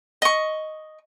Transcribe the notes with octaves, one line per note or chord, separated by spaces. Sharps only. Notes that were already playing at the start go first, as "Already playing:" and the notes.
D#5 C#6